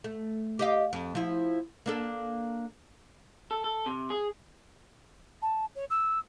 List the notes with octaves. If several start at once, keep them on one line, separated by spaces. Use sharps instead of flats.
A3
G4 D#5 F5
F2
F3 E4
A#3 D4 A4
A4
A4
C3
G#4
A5
C#5
E6